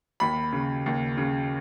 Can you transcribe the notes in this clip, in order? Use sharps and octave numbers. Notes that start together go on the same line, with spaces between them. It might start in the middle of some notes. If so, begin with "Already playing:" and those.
D#2 B5
C#3
D#2
C#3